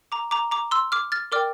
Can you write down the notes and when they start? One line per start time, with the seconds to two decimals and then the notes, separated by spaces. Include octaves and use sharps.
0.12 A#5 D6
0.31 A#5 D6
0.51 A#5 D6
0.71 C6 E6
0.92 D6 F6
1.12 F6 A6
1.32 A#4 D5 G5 D6 F6